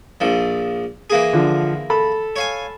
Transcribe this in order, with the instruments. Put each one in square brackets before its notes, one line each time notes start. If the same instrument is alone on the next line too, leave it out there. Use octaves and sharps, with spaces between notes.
[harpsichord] A#1 F3
E3 A#3 G#4
[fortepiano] D3 F3
A4 B5
[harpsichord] C#5 F5 G#5